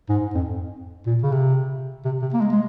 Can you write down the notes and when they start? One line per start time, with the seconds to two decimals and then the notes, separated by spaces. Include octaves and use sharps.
0.09 G#2
0.34 F2
1.06 A#2
1.22 C#3
1.32 C3
2.05 C3
2.22 C3
2.34 A#3
2.41 G#3
2.52 G#3